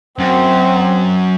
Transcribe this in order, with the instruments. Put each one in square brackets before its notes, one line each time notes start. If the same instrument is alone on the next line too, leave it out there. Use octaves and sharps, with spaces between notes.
[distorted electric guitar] F#2 [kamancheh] C4